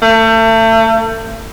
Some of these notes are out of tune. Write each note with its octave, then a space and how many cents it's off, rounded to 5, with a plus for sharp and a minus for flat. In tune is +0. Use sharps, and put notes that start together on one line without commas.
A3 +35